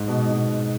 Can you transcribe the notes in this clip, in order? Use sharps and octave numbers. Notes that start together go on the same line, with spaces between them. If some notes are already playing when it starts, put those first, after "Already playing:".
Already playing: G#2
B2
B2